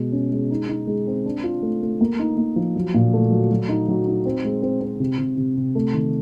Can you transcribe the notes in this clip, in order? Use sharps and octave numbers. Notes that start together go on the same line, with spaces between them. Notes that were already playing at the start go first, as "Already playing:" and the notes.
Already playing: B2 G#3
C#4
G#3
D#4
D#4
G#3
C4
D4
F4
A3
A3
A#3
D#4
A#3
F3
F#3
A#2
A3
F#3
F#3
D#4
F#3
D#4
C4
G#3
C4
C4
C3
C3
C3
C3
A3
D#3